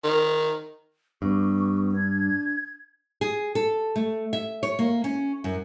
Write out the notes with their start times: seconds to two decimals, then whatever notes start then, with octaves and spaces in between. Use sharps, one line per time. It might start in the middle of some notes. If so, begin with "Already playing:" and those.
0.04 D#3
1.22 G2 B3 G4 C#6
1.96 D4 G#6
3.21 G#4
3.55 A4
3.96 A3
4.33 E5
4.63 C#5
4.79 A#3
5.04 C#4
5.44 F#2